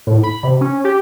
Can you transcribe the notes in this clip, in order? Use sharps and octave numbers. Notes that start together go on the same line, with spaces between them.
A2
B5
C3
C#4
G4